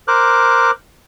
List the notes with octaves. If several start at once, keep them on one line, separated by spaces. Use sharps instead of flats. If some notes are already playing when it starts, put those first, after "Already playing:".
A#4 C5 D6 F#6